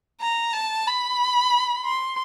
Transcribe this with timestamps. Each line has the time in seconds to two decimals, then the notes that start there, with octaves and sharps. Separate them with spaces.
0.21 A#5
0.53 A5
0.87 B5
1.85 C6